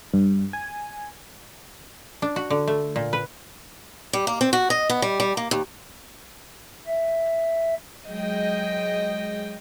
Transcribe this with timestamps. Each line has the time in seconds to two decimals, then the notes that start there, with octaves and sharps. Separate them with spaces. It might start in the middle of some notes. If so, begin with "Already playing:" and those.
0.14 G2
0.53 G#5
2.22 D4
2.36 F#4
2.50 D3
2.67 A3
2.96 A#2
3.13 B4
4.13 G3
4.27 A#3
4.41 C4
4.53 F#4
4.70 D#5
4.90 B3
5.02 G3
5.20 G3
5.37 A#3
5.51 D#2
6.86 E5
8.08 F#3 G#3 D#5 G5